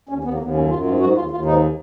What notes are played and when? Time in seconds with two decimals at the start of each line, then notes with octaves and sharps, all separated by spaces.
0.09 D#2 C#4
0.24 D#2 B3
0.34 A#3
0.39 D#2
0.45 B3
0.54 F#2 C#4
0.70 F#2 F4
0.84 G#2 F4
1.00 G#2 F#4
1.16 D#2 F4
1.31 D#2 F4
1.45 G#2 D#4